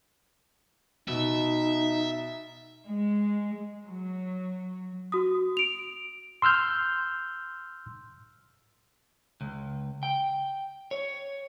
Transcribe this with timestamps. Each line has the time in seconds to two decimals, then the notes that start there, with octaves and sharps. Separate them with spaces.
1.08 B2 D#4 E5
2.86 G#3
3.85 F#3
5.12 F#4 D#6
5.57 D7 F7
6.42 C6 E6 F6 G6
9.41 C#2
10.03 G5
10.91 C#5